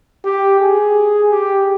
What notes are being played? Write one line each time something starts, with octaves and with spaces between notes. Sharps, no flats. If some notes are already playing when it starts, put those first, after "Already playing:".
G4
G#4
G4